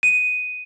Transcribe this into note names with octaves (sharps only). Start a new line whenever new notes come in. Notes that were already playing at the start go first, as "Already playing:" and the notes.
D#7